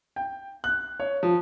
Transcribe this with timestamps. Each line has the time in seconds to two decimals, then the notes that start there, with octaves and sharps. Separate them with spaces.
0.16 G5
0.64 F#6
1.00 C#5
1.23 F3